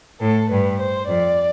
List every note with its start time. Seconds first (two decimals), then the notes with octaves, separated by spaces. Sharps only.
0.21 A2 A4
0.50 G2 B4
0.80 C5
1.08 F2 D5